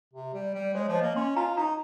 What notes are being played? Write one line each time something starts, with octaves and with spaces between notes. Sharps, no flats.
C3
G3
G3
G#3 C#5
F3 C#5
D#5
A#3
C#4 C6
F4 A#5
D#4 A#5